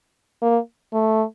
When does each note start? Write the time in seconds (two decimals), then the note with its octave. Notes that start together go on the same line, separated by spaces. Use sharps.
0.42 A#3
0.93 A3